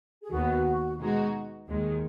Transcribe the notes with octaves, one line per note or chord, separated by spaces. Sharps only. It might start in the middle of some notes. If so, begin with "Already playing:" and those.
G#4
D#2 D#3 B3 F#4
B2 G#3 D#4 F#4
D#2 D#3 G#3